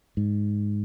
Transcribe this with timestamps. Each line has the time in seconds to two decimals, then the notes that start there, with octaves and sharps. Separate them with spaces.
0.17 G#2